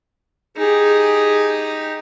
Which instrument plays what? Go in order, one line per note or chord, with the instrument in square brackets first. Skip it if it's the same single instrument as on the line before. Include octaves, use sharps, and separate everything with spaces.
[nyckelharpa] D#4 G4 [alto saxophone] G#4